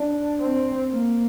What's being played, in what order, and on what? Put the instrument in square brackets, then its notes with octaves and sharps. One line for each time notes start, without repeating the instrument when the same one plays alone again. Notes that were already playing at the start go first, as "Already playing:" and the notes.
Already playing: [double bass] D4
C4
A#3